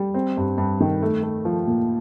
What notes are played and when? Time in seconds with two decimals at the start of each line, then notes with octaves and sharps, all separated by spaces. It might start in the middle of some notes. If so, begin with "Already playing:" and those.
Already playing: G3
0.14 C4
0.37 G2
0.58 G2
0.80 D#3
1.02 A3
1.23 A3
1.45 F3
1.67 A#2